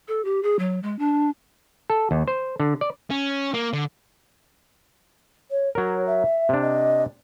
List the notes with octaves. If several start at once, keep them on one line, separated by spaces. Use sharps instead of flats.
A4
G4
G#4
F#3
G#3
D4
A4
D#2
C5
D3
D5
C#4
A#3
D3
C#5
F#3 A#4 C#5
E5
C3 D4
D#5